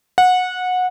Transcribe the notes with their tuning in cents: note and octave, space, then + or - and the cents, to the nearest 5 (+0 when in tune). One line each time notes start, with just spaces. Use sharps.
F#5 -20